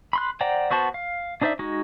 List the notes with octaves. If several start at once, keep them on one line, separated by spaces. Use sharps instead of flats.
B5 C6 F#6
C5 D5 F#5 G5 A#5
B3 F#4 C5 A5
F5
D4 D#4 C5 D5 E5
G#3 D#4 F#4